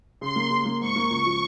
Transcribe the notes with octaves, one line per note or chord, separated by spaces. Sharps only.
C#3 C6
A#3
C#3
A#3
G#2 C#6
A#3
C#2
F3